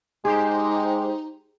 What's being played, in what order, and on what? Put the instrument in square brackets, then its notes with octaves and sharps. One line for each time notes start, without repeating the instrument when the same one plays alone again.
[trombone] G#3 [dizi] D#4 [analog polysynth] G4 C5 [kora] G#4